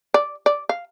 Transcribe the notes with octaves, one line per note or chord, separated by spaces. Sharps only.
D5
D5
F5